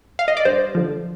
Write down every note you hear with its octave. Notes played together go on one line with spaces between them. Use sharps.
F5
D#5
D5
G2 C5
D3 F3